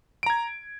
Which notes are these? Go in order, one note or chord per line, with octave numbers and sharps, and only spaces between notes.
A#5 G#6 D7